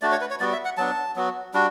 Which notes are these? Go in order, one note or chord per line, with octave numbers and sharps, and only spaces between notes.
A3 D4 F#4 D5
C#5
B4
C#5
G3 B3 F#4 D5
E5
F#5
F#3 B3 D4 A5
F#3 B3 F#4
G3 D4 F#4